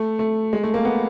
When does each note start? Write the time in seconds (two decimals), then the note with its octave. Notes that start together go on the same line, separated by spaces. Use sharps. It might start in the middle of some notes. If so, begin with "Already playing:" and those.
Already playing: A3
0.19 A3
0.53 G#3
0.63 A3
0.74 A#3
0.85 B3